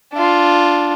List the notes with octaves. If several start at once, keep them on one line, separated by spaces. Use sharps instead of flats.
D4 F4